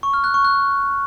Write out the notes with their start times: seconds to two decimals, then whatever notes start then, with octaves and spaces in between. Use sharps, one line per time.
0.03 C#6
0.14 F6
0.24 F#6
0.34 C#6
0.45 F#6